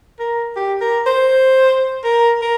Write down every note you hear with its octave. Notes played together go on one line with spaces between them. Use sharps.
A#4
G4
A#4
C5
A#4
A#4